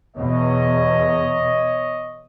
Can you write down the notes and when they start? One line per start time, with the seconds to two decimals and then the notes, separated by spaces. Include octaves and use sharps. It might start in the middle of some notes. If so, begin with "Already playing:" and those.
0.17 E2 B2 C#5 D#5